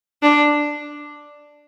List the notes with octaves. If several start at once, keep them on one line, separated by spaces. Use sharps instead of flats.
D4